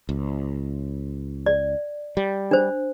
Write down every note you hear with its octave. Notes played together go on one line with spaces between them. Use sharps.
C#2
D5
G3
D4 C5